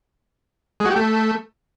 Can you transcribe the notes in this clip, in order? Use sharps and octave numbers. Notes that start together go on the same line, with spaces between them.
G#3
F#4
G4
A3